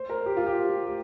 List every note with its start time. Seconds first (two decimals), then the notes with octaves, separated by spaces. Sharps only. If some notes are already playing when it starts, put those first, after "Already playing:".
Already playing: C5
0.10 A#4
0.26 G4
0.37 F4
0.46 G4
0.86 G4